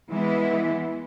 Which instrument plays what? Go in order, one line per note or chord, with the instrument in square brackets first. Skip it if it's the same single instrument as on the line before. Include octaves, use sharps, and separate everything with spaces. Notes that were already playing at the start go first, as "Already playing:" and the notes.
[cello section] E3 G#3 B3 E4